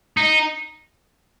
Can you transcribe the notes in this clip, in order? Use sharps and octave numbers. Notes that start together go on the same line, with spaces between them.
D#4